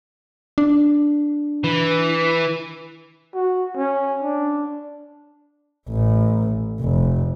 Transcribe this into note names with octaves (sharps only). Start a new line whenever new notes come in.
D4
E3
F#4
C#4
D4
A1
F1